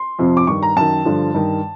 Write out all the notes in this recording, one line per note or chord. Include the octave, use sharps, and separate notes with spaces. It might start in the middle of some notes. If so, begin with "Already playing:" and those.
Already playing: C6
F2 C3 F3
D6
G2 D#3 C#6
A#5
F#2 D#3 A5
G2 D3 F3
G2 D#3